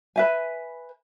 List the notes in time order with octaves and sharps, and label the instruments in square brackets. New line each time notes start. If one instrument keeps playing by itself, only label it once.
[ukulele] B4 E5 G#5